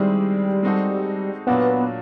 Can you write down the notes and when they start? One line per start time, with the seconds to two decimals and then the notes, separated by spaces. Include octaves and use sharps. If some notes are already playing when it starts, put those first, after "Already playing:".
Already playing: D#3 G3 G#3 C4 E4 G#4
0.63 G#3 C4 D#4 F#4 A4
1.47 A#2 F#3 A#3 B3 D4